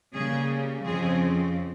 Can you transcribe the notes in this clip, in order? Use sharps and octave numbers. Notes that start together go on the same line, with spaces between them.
C#3 G3 A#3 G#4
F2 C#3 F3 C4 G#4